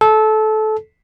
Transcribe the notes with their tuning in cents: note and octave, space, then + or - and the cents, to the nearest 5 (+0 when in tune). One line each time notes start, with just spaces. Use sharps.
A4 -20